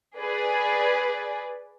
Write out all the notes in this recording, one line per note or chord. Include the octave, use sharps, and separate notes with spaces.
G#4 B4 D5